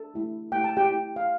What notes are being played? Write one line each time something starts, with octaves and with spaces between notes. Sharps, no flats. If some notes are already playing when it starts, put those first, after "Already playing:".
Already playing: A4
A3 E4 G4
A3 E4 G4 G5
A5
G4 G5
A3 E4 G4
F5